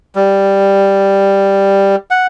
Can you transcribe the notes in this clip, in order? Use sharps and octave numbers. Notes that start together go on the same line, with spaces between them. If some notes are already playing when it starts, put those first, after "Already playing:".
G3
F#5